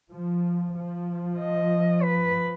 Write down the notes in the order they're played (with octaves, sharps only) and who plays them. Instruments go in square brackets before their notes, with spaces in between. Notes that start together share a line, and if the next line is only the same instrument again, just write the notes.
[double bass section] F3
F3
[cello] D#5
B4